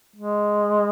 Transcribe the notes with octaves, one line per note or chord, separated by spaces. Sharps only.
G#3